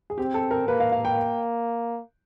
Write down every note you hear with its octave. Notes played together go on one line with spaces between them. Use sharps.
G#4
C4 G4
A4
A#4
A#3 B4
F5
F5
G5